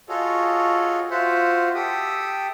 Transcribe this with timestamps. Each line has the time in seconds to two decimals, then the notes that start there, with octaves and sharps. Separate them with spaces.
0.09 F4 F#4 G#4 A4 C#5 D#5
1.11 F4 F#4 C5 E5 F#5
1.75 G4 A4 E5 G5 D#6